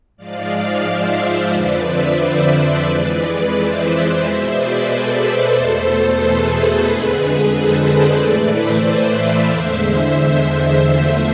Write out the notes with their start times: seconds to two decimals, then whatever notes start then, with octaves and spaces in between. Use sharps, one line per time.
0.17 G#2 F3 G#3 D5 F5
0.84 C5 E5
1.50 F2 D3 F3 B4 D5
1.84 C5 E5
2.50 B4 D5
2.83 F2 E3 G#3 B4 D5
3.50 C5 E5
4.16 B2 G#3 C5 E5
4.50 B4 D5
4.83 A4 C5
5.50 E2 B2 A3 A4 C5
6.16 G#4 B4
6.50 A4 C5
6.83 F2 D3 G#3 G#4 B4
7.50 A4 C5
7.83 B4 D5
8.16 A2 E3 A3 B4 D5
8.49 C5 E5
9.16 D5 F5
9.49 E2 D3 G#3 C5 E5
10.16 C5 E5
10.83 E2 D3 F3 A3